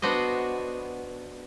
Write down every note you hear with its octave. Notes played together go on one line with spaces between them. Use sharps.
B3 D4 F#4 C5 D#5